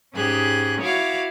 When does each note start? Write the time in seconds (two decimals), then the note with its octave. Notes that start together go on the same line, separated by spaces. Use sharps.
0.13 G#2 C#4 G4 G#4 F#6
0.81 E4 F#4 C#5 F5 D6